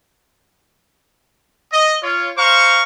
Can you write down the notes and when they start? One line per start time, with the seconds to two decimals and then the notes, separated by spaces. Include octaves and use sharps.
1.72 D#5
2.02 F4 C#5
2.37 C5 F5 A#5 C#6